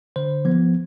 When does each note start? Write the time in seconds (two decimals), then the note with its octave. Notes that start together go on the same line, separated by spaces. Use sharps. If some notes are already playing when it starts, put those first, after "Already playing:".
0.16 D3 C5
0.45 F3 B3